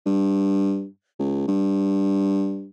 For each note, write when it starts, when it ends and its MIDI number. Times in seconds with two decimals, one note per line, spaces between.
0.06 0.85 43
1.19 1.47 37
1.48 2.67 43